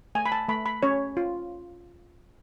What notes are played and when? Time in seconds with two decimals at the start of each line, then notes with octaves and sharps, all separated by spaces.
0.15 A3 G#5
0.26 B5
0.32 A5
0.48 A3 B5
0.66 B5
0.83 C#4 C#5
1.17 F4